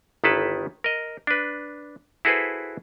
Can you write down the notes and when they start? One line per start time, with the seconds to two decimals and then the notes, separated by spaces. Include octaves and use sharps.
0.24 G1 D#3 E4 A4 B4 A5
0.84 A#4 D#5
1.27 D4 B4
2.25 E4 F#4 G#4 A4 B4 C5